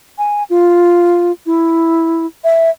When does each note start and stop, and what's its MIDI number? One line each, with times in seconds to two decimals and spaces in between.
0.18 0.43 80
0.50 1.32 65
1.46 2.26 64
2.44 2.70 76